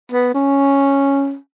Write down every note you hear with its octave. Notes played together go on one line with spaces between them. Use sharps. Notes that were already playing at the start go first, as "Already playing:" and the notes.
B3
C#4